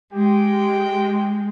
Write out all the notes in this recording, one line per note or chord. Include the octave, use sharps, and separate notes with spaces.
G#3 G4 G5